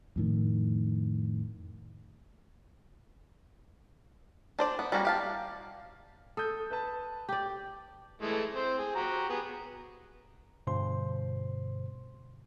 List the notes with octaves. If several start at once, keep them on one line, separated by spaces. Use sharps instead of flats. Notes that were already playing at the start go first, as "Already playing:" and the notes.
F2 A2 D#3
D4 C5 D5
B3
G3 A#3 C#4 F#4
G4 F5 A5
A4 D#6 G6
B4 A5
G4 D5
E3 G#3 A3
C4 C5
G#4
F#4 G4 A#5
B3 G#4
G2 B2 D3 C5 C6